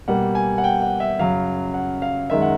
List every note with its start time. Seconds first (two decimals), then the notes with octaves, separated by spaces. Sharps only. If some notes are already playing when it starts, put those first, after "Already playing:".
0.08 B2 G3 A#3 F#5
0.35 G#5
0.58 F#5
0.64 G5
0.82 F#5
1.00 E5
1.19 F#2 C#3 F#3 F5
1.74 F#5
2.02 F5
2.30 F#2 D#3 G#3 E5
2.42 F#5